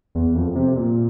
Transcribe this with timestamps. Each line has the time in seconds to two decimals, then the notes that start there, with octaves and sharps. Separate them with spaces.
0.15 E2
0.36 F2
0.55 C3
0.76 A#2